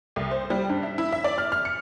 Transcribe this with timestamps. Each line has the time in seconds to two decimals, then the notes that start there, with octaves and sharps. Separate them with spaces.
0.16 C2
0.31 C5
0.50 G3
0.70 G2
0.83 E5
0.98 E4
1.12 E5
1.24 D5
1.38 F6
1.52 F6
1.65 C#7